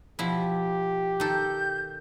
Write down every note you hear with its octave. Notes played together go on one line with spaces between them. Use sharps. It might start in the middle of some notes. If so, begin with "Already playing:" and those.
B2 F3 E4 G4
D#3 A4 G6